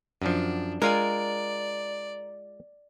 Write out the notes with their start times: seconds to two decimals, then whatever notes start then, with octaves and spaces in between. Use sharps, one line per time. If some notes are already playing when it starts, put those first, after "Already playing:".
0.22 F#2 F3 D4
0.82 G#3 F4 A#4 D5 G#5